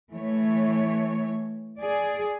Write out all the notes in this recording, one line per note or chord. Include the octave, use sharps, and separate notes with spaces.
E3 A3 C#5
G#4 D5